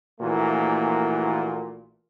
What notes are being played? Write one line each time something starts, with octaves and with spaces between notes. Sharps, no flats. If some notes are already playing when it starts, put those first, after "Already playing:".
A#1 A#2 E3 A3 A#3 F#4